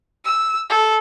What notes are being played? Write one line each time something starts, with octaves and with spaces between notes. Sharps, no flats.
E6
A4